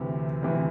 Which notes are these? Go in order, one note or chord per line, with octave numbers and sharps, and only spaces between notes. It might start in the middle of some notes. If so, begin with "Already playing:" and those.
Already playing: D2 C3 E3
D2 C3 E3